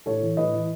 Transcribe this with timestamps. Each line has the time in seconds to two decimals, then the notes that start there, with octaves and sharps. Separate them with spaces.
0.06 A2 A4 C#5
0.22 E3
0.37 A2 B4 D#5
0.54 E3